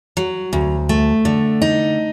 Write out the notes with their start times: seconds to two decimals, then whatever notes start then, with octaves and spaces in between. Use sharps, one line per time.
0.17 F#3
0.53 D2
0.89 A3
1.25 D3
1.62 D#4